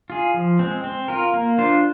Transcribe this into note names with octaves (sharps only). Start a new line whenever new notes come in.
F4 G#4
F3
G#3 C4
C4
F4 A#4
A#3
D4 F4 C5